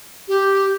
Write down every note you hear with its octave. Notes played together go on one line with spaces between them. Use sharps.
G4